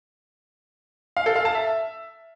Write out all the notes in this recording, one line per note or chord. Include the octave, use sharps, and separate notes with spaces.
F5
A4
F5
A5
E5